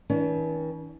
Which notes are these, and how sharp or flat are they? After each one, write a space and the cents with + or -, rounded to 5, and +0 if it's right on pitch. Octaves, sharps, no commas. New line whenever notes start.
E3 -45 C#4 +45